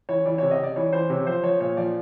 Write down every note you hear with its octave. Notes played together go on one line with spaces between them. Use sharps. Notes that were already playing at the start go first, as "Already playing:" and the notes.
E3 C#5
E3 D5
C3 C#5
D#5
C3 D5
E3 C#5
E3 C5
C3 C#5
F3 C5
F3 C#5
A#2 C#5
F3 D5